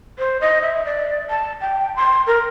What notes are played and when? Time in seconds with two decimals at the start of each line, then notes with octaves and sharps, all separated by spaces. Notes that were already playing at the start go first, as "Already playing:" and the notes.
0.19 C5
0.41 D#5
0.62 E5
0.85 D5
1.30 A5
1.61 G5
1.96 C6
2.27 A#4